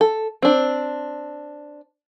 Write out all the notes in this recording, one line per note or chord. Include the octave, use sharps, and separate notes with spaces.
A4
C4 D4